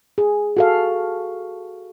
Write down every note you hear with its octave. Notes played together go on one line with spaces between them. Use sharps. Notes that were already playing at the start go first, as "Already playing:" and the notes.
G#4
F#4 A4 F5